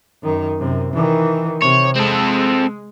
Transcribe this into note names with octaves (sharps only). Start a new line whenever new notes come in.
F#2 D#3
F#2 C3
D#3 E3
C3 C#5
G#3 C4 A4